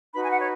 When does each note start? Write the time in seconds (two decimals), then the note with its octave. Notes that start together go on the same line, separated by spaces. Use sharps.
0.12 D#4 F#4 B4 B5
0.22 G#5
0.30 F#5
0.40 C#5